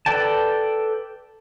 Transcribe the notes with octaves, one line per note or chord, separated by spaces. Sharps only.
A4 B4 D5 G5 A5